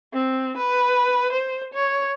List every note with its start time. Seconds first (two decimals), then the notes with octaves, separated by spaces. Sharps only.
0.13 C4
0.57 B4
1.32 C5
1.74 C#5